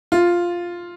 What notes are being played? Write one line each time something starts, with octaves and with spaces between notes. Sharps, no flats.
F4